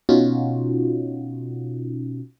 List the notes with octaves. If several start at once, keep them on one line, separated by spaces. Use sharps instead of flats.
B2 C#4 D#4 F4 F#4